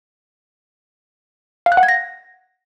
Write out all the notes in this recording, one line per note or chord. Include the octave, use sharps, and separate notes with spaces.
F5
F#6
F#5
G#6
A#6